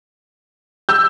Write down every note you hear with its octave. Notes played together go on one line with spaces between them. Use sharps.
E6 G6